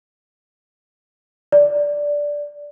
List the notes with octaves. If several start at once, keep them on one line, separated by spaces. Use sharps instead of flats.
D5